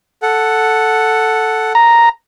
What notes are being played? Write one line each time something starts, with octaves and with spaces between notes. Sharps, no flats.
A4 F#5
A#5